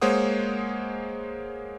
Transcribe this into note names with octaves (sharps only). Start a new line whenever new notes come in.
G#3 A#3 C5 C#5 F#5 D#6